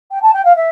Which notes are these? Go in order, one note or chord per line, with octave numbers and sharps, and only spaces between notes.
G5
A5
G5
F5
E5